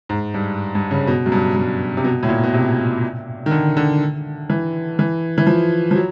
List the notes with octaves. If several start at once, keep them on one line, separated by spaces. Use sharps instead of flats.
G#2
G2
G2
C#3
B2
F#2
G2
G2
C3
B2
A2
A#2
B2
C3
D#3
D3
D3
E3
E3
E3
F3
F3
F#3